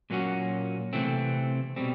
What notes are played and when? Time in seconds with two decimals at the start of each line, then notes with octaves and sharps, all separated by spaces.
0.10 A#2 F#3 A#3 C#4 F#4
0.93 C3 E3 A3 C4
1.76 B2 G3 C4